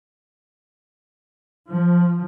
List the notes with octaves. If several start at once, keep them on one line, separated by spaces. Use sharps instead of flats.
F3